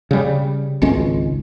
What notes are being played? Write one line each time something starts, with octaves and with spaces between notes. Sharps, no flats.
C#3 G3
G#1 C#2 G#3 C#4